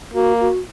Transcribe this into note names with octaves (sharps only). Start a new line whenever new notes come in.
A#3 F#4
F#4